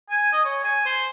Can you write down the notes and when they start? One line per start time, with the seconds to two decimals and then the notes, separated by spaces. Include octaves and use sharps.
0.10 G#5
0.33 D#5
0.45 C#5
0.64 G#5
0.86 C5